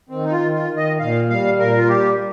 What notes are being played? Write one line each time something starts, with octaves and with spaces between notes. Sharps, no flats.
D#3 C4
D#4
F4
D#3
F4
D#3
D#5
A#2 F5
G3 F5
A#2 A#4
F4
G3 G4